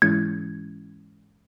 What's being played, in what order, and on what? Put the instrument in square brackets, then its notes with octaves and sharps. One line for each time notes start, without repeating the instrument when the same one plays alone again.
[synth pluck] G#2 E3 G#3 C#4 E4 [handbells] G#6